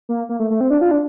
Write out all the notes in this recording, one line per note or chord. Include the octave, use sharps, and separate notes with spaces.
A#3
A#3
A3
A3
C4
D4
F4
D4